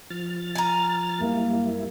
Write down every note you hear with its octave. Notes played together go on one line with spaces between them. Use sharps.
F3 F6 A6
G#5 A#5
F#2 G3 A#3 E4